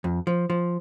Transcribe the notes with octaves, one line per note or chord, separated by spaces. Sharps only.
F2
F3
F3